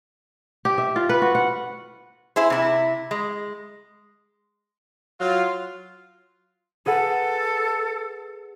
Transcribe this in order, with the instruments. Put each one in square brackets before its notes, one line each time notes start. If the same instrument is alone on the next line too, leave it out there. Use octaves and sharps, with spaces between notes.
[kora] G4
E5
F4
B4
F#4
F#5
[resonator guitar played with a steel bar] E4 G#4 C5
C3 E4
G#3
[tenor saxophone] F#3 [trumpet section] F4
[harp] G#4 B4 F#5 [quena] A4